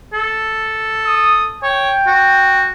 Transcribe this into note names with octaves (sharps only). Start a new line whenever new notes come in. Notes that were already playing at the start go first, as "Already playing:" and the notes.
A4
D#6
C#5 G5
F#4